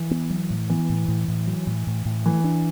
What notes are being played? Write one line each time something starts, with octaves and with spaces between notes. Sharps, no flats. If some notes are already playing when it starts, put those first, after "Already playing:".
Already playing: E3
B3
F#3
A2
E3 B3
A2
A2
A2
F#3
A2
A2
A2
E3 A3
D4